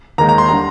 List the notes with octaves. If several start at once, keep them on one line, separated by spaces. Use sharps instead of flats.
D#2 D#3 G#3 A#5
A#5
C6
D3 G3 A#5